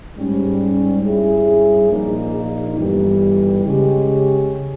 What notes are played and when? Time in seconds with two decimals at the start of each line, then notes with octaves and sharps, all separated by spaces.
0.16 G#2 G3 C#4
1.03 G2 G3 C#4 E4 G#4
1.90 A#1 A#2 A#3 D#4
2.77 G1 G2 E3 G3
3.64 C#3 G#3 C#4 G4